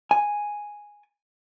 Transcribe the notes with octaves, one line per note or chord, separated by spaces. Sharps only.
G#5